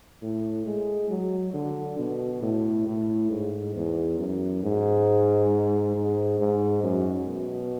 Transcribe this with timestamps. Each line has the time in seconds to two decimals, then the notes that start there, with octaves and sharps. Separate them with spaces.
0.22 A2
0.67 G#3
1.10 F#3
1.54 D3
1.99 B2
2.42 A2
2.87 A2
3.31 G#2
3.75 E2
4.19 F#2
4.63 G#2
5.96 G#2
6.39 G#2
6.83 F#2
7.28 B2